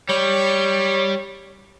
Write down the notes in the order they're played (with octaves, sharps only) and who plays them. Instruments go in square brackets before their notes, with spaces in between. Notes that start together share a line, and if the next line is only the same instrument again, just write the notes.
[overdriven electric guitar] G3 [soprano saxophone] C#5